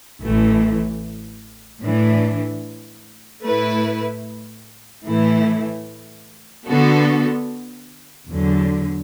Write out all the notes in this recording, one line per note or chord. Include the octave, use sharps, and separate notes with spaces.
A1 A2 E3 A3
A2 E3 D4
A2 A3 E4 B4
A2 E3 A3 E4
D3 B3 F#4 A4
E2 D3 F#3